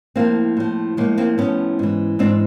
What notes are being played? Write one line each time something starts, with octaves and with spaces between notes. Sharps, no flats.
A2 F3 A#3 C4
A2 F3
A2 F3 G#3 A#3
A#3 C4
A2 F3 B3 C#4
G#2 E3
G#2 E3 C4 D4